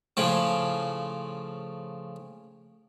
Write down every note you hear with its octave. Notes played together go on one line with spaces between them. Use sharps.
A2 C#3 F3